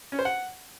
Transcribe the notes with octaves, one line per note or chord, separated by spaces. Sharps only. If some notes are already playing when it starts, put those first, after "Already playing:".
C#4
C5
F#5